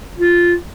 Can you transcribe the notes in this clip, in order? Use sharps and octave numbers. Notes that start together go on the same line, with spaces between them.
F4